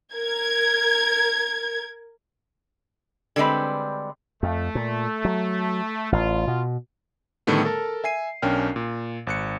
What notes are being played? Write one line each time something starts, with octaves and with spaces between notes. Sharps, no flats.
A#4 G#6
D3 G3 G#3 C4 B4
F2 A3
A#2
F#3
A1 F4
B2
A2 D3 D#3 G3 A3 B3
A4 A#4 A5
E5 G#5 C7 D#7
B1 C#4 D4 A#4 G5 F6
A#2
G#1 F#6 C#7